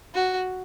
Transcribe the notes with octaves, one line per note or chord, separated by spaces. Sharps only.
F#4